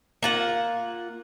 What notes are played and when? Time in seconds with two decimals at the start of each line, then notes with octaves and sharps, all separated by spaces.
0.23 A#3 F4 F#5